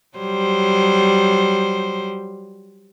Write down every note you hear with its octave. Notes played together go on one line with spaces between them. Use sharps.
F#3 G3 C5